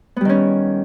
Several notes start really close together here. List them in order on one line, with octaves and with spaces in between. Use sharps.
B3 G3 D#3 C#4